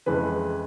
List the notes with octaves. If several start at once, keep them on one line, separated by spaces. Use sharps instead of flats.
F2 C#3 E3 G#3 B4